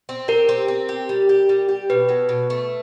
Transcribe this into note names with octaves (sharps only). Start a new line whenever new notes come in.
C4
G4 A#4
C4
C4
G4
G3
G4
G3
G4
B2 B4
F#3
B2
A3